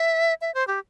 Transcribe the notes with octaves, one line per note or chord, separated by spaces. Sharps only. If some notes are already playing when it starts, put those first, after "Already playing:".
Already playing: E5
E5
C5
G4